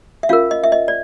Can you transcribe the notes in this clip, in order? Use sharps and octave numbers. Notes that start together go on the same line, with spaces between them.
E5
C#4 F4 A#4 F5
D#5
E5
D#5
D5